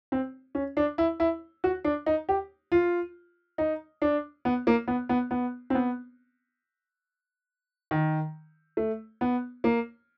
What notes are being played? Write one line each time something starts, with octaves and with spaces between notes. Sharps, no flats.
C4
C#4
D4
E4
E4
F#4
D4
D#4
G4
F4
D#4
D4
B3
A#3
B3
B3
B3
C4
B3
D#3
A3
B3
A#3